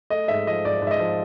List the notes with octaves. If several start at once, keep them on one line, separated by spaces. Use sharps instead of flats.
A3 D#5
G#2 E5
F3 D#5
G#2 D5
G#2
E5
D#5
F3